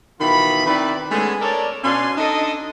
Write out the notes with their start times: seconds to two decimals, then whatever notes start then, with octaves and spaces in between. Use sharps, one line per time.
0.21 B2 D#3 E3 F4 B5
0.66 D#3 C4 E4 B4 D5 B5
1.11 G#3 A3 B3 C#4 D4 G#4
1.41 A4 A#4 C#5 D5
1.84 B2 C#4 D4 F5 G#5 C6
2.18 D4 D#4 A4 D#5